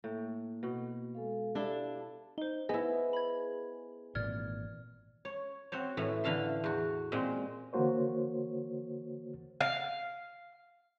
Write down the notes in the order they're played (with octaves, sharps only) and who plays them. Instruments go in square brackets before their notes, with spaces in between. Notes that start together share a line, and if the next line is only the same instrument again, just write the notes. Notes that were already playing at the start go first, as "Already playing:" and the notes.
[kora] A2 [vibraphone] A#3
[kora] B2
[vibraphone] G#3 A4 F5
[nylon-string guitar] D4 A4 [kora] E4 [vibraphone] G4 F5
[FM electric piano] D#4 [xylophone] C5 G7
[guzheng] B3 E4 [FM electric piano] G#4 [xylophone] D#5
[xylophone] B5 G#6
[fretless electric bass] G#1 A#2 E3 [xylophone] D5 F6 G#6
[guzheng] C#5
C4 F#4 C5 C#5
A2 E3 C#5
D3 E3 F5 A5 C6
E2 F#4
A#2 G#3 C4
[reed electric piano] D3 E3 A#3 F#4 C5 C#5
[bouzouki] F5